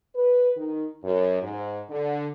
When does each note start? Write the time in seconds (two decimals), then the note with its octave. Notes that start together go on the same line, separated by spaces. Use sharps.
0.15 B4
0.56 D#3
1.04 F#2
1.42 G#2
1.89 D3